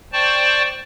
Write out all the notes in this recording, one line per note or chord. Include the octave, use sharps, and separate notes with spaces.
C5 D5 G5 A5 C#6